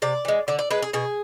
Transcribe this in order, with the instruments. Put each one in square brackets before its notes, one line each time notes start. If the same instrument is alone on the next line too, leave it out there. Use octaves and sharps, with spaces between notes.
[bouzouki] C3 D5
E3 G#3
D3 D5
D5
G#3 B4
G#4
B2 G#4